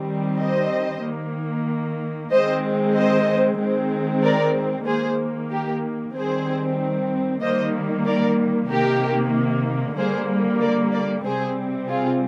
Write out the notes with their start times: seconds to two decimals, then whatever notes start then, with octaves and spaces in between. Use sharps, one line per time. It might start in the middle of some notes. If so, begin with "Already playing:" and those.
Already playing: D#3 G3 C4
0.41 C5 D#5
1.04 D#3 A#3
2.31 D#3 G#3 C4 C5 D#5
2.96 C5 D#5
3.60 D#3 G#3 C4
4.23 A#4 D5
4.86 D#3 A#3 G#4 C5
5.51 G4 A#4
6.14 D#3 G3 C4 G#4 C5
7.42 D#3 G3 A#3 C5 D#5
8.06 A#4 D5
8.70 C3 D#3 A#3 G4 A#4
9.97 D3 G3 A#3 G#4 C5
10.61 A#4 D5
10.93 A#4 D5
11.25 C3 G3 C4 G#4 C5
11.89 F4 G#4